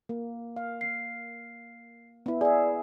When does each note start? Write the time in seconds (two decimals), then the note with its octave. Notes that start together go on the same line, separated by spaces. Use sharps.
0.09 A#3
0.56 F5
0.81 C7
2.26 B3 E4
2.41 G#4 D5 E5